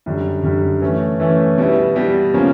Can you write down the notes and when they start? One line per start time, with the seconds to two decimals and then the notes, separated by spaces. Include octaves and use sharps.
0.06 F#2 D3 G3
0.43 F#2 D3 G3
0.81 E3 A3 C#4
1.20 E3 A3 C#4
1.58 B2 G3 B3 E4
1.95 B2 G3 B3 E4
2.34 C#3 F3 A#3 C#4